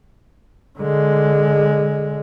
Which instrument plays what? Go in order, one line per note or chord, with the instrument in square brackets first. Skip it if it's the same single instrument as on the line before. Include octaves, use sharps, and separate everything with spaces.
[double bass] D3 G#3